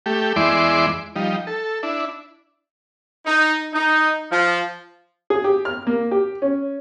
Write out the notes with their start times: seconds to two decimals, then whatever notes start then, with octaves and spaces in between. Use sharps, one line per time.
0.06 A3 G4
0.36 E2 G#3 E4 D5 C6 D6
1.16 F3 G3 D#4
1.47 A4
1.83 D4 E4
3.26 D#4
3.73 D#4
4.31 F3
5.30 G#4
5.44 G4
5.65 F6
5.87 A#3
6.11 G4
6.42 C#4